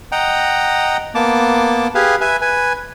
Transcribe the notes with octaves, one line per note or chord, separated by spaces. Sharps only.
D#5 F#5 G5 A#5
A#3 B3 A5 D6
G4 G#4 B4 F5
B4 E5 G#5
B4 G#5